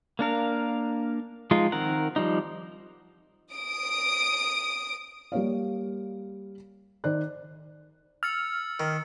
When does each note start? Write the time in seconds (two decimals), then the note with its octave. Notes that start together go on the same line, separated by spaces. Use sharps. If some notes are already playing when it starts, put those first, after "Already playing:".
0.19 A#3 D4 A#4 F5
1.51 F3 G#3 D#4 F4
1.72 D#3 C4 A#4 F#5
2.16 F3 G3 D#4
3.54 D#6 D7
5.32 G3 A#3 C#5 F5
7.04 D#3 C5 D5 F#6
8.23 E6 F6 A6 C#7
8.80 D#3